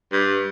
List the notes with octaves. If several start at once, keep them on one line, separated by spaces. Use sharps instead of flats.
G2